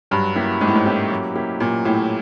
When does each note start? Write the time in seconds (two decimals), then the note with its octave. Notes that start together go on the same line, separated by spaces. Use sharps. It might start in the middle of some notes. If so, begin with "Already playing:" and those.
0.11 G2 F#3
0.36 A#3 C#4 E4 G4
0.61 G#2 F#3
0.68 A2
0.75 G#2
0.86 A#3 C#4 E4 G4
1.10 F#3
1.36 A#3 C#4 E4 G4
1.60 A#2 F#3
1.85 A2 A#3 C#4 E4 G4